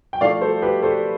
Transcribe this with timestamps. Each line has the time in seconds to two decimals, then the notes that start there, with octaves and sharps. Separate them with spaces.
0.13 G5
0.21 F3 A3 E4 D5 F5
0.41 A4 C5
0.62 G4 B4
0.83 A4 C5